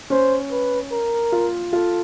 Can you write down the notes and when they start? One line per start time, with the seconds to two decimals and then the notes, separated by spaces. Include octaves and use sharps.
0.10 C#4 C5
0.51 B4
0.91 A#4
1.32 F4
1.73 F4 A4